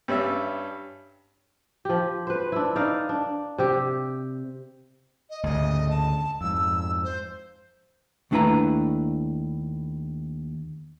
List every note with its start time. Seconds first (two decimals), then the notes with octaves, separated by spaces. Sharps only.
0.08 G2 G3 C#4 E5
1.85 F3 G4
2.27 B4 C5
2.52 D4 E4
2.76 D#4 D5 F5
3.09 D4
3.58 C3 G4
5.30 D#5
5.43 D2 G#2 C#3 D#5
5.90 A5
6.41 F2 G#2 E6
7.04 C5
8.31 D#2 A3 D4 E4 B4 A#5